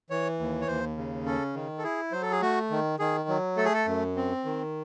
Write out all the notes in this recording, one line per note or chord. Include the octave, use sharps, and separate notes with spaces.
E3 C#5
D#2
C#5
D#2 C5
C#3
C#4 A4
D#3
A4
E4 G#4
F#3 C5
A4
G#4
A3 F#4
D#3
D#3 G#4
F#3
A3 A4
G#4
A4
F#2
C4
D#3